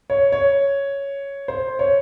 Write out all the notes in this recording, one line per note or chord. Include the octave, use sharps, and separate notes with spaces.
C#5
C#5
C5
C#5